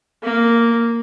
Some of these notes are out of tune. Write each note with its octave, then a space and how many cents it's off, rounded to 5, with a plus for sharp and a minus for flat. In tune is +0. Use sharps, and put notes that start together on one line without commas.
A#3 -5